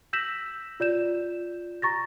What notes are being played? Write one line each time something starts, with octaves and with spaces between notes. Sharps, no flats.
E6 G6 A#6 B6 E7 F#7
F4 D5 G6 E7
A#5 C#6 A6 A#6